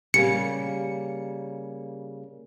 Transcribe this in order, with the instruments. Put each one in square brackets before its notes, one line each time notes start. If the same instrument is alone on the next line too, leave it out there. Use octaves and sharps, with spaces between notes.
[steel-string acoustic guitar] C#3 G3 A#3 [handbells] C#7